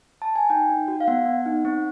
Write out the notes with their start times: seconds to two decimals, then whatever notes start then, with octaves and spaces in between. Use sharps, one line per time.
0.22 A5
0.35 G#5
0.50 D#4 G5
0.70 D#4
0.88 F#4
1.00 F5
1.07 B3 F#5
1.26 B3
1.46 D#4
1.65 C4